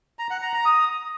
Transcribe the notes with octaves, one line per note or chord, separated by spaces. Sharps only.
A#5
F#5
A#5
A#5
D#6